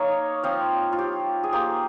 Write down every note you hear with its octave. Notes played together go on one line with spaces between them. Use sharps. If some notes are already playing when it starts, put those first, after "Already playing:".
Already playing: A#3 D#4 C#5 D#5 F5
F3 C4 F4
F4
G4
G#4
F3 A#3 F4 G4